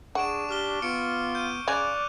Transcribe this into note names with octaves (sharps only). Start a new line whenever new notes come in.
D4 G#4 F#5 C#6 D7 E7
G4 D6 F6 G7
B3 F4 C#6 C#7 D7
G6 D#7
C#3 G#4 D5 C#6 F#6 F7